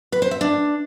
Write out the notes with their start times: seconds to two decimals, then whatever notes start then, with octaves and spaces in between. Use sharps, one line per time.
0.12 B4
0.22 C5
0.31 E5
0.41 D4